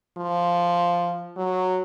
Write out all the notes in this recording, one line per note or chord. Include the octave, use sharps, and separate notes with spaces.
F3
F#3